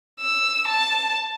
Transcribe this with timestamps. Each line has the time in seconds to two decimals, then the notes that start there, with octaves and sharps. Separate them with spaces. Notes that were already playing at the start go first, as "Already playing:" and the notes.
0.20 E6
0.67 A5